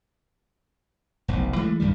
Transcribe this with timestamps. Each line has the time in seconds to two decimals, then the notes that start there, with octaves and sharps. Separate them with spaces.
1.28 F1 B1
1.56 E3 G#3 A3
1.80 B1 G2 D#3 G3